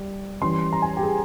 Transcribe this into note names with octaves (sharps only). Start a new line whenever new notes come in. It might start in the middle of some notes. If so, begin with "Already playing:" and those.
Already playing: G3
E3 G3 C#4 C6
A#5
G#5
G4
G#4